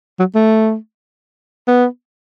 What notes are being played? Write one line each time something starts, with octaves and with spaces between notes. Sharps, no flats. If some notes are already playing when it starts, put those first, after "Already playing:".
F#3
A3
B3